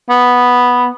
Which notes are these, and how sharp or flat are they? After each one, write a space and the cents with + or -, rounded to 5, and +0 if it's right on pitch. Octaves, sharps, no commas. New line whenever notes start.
B3 -5